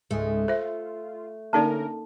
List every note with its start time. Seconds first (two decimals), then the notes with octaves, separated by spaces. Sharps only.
0.11 C#2 G#2 G#3 A3
0.48 F4 C5 E5
1.53 D3 A#3 C#4 D#4 A4 A#4 D5 A5